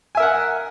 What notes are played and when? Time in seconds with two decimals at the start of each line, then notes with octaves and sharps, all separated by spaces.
0.15 G#5
0.17 E5
0.20 A#4
0.22 F#5